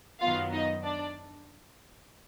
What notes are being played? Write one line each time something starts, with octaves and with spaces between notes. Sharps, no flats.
F#2 D#3 F#3 B3 F4 F5
D#4 D#5
D4 D5